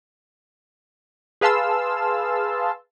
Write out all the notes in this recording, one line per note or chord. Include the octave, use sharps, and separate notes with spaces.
G#4 B4 F5 A5 C6 E6